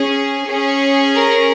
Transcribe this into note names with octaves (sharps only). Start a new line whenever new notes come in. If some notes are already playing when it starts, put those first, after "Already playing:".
Already playing: C#4 G#4
C#4 G#4
A#4